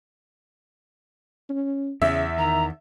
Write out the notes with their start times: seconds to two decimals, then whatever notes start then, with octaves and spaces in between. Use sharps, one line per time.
1.49 C#4
2.02 E2 C#3 E5
2.38 D#3 A#5